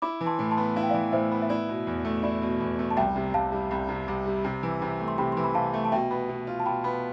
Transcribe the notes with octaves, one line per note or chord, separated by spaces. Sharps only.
E4 B5 D6
E3
A5 C6
A2
A5 C6
B3
E4 F5
G5
E3 D5 F5
A2 C5 E5
B3
E5
E4 D5
B2
E2
A3
E4 D5
B2
E2
A3
A5
C2 E5 G5
C3
C2 F5 A5
G3
C2
C3
C2
G3
C3
E3
C3
A3
C6
C3 G5 B5
E3 C6
B5
C3 F5 A5
A3
A5
B2 E5 G5
B3
B2
F4
A5
B2 G5 B5
B3